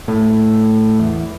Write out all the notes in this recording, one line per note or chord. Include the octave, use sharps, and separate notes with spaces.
A2
E2